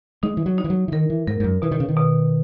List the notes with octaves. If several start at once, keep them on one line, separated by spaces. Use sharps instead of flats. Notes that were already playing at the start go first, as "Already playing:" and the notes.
G#3 D#4
E3
F#3
D#4
E3
F#3
E3
D#3 A#4
E3
G#2 A#4
G#2
F#2
B2 E3
D#3
C#3
D#3
B2